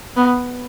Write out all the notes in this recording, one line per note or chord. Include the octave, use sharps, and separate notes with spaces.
B3